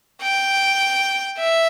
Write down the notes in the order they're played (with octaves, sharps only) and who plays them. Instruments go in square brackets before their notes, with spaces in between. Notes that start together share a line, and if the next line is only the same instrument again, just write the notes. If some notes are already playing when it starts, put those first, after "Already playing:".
[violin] G5
E5